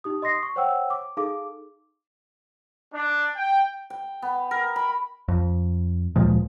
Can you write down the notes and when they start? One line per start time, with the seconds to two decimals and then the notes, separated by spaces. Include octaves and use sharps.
0.04 D#4 G4 D#6
0.22 D#5 C6 D#6 A#6 C7
0.43 C#6
0.56 C5 C#5 F#5 G5 E6
0.90 D6
1.17 D#4 G#4 A4 F5 D6
2.93 D4
3.35 G5
3.90 G5
4.22 B3
4.51 A#4
4.76 B5
5.28 F2
6.16 D2 A#2 F3 G#3